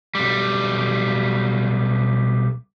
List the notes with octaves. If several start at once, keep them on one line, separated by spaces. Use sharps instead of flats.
B1 G3